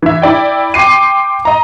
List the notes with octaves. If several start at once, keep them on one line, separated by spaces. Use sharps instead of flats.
E3 E5
E4 D5 G5
G5 C6 D6 C7 D#7
D#5 A#5